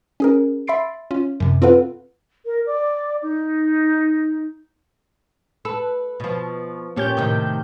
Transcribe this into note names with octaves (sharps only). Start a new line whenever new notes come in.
C#4 G#4 A#4
E5 B5 C6 A6 C7 D7
C#4 F4
F#2 C3
C4 F4 A4 B4 F5 F#5
A#4
D5
D#4
A4 B4
B2 F3
A#2 A#3 C#4 G4 G6
A2 C3 D#3